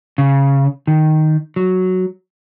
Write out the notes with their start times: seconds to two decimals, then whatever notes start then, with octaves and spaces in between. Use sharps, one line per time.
0.18 C#3
0.87 D#3
1.56 F#3